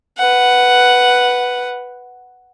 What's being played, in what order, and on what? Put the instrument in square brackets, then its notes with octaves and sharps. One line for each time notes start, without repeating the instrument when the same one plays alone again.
[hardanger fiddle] B4 F#5